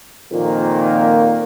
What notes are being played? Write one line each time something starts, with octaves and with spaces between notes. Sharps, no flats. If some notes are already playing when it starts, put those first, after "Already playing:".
F2 A#2 D#3 A#3